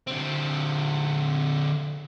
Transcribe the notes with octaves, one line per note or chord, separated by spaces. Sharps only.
D3 C4